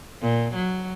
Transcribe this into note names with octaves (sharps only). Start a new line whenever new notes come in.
A#2
F#3